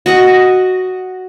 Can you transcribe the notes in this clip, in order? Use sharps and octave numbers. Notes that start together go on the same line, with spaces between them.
F#4 D#5 F#5